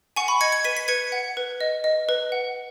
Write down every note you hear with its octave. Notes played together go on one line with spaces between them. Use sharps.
F#5 G#5 C#6
B5
D#5 G#6 C#7
G#6 C#7
B4 B6 D#7
B6 D#7
B4 G#6 C#7
F#5
B4
D#5
D#5
B4
F#5